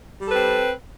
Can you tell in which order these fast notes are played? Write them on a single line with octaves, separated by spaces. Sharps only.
G3 A4 B4 C4